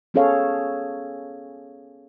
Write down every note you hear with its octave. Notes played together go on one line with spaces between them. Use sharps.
B3 C#4 G#4 A4 C#5 F5